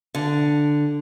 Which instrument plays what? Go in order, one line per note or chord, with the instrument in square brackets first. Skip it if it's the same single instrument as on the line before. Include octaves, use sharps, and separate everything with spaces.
[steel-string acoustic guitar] D3